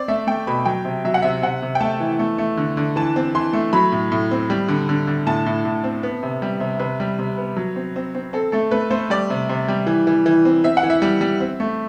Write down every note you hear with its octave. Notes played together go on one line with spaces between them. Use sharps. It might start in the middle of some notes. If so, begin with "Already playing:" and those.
Already playing: C4 D5
A3 E5
A3 G5
B2 B5
F#3 G5
C3
F#3 E5
F#5
C3 E5
C3 F#5
C3
G5
A3 A5
E3
A3
A3
D3
D3
E3 A5
C4
E3 C6
A3
F#3 B5
A2
A2
C4
G3
D3
D3
D3
A2 A5
A2
A2
C4
B3
C3
G3
C3
C3 B4
G3
C3
B3
F#3
C4
C4
C4
C4 A4
A3 A4
A3 B4
A3 C5
G3 D5
C3
C3
G3
E3
E3
E3
C4
C4 E5
F#5
E3
E5
G3
G3
C4
A3